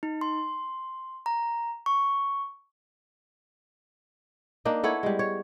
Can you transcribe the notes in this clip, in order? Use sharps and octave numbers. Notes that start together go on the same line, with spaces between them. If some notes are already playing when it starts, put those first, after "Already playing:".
D#4
C6
A#5
C#6
A#3 D4 D#4
B3 E4 A4 C#5
G3 G#3
C#5